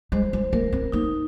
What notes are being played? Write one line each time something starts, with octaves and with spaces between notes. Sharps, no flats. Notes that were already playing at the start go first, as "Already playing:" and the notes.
G#3 C5
G#3
A#3 A#4
C4
A#3 D#4